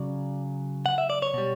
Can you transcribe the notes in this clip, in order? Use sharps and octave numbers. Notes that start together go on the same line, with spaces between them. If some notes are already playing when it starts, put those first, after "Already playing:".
Already playing: C#3 F#3 D5
F#5
E5
D5
C#5
B2 G3